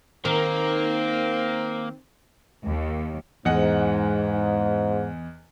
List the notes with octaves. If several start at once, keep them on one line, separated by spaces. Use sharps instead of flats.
D#3 A#3 C4 A#4
D#2
E2 G#2 D#5 F#5